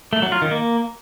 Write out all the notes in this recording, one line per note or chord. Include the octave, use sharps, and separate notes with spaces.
A3
F#3
F4
D#3
A#3